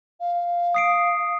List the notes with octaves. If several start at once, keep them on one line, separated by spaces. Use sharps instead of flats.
F5
D#6 C7 D7